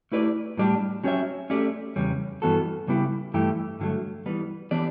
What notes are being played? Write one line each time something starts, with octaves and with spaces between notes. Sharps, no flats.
A3 E4 G4 B4 D5
A2 G3 D4 G4 D5
F#3 C#4 G4 C#5 E5
A3 C#4 G4 D5
E2 C#3 G3 C#4
G2 E3 B3 F#4 A4
C#3 G3 B3 E4 G4
G2 E3 A3 E4 G4
G2 D3 F#3 A3
E3 G3 B3
E3 B3 D4 G4 D5